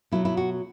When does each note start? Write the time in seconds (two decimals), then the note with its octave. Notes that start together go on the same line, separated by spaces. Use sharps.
0.11 B2 F#3 A3 E4
0.25 E4
0.37 F#4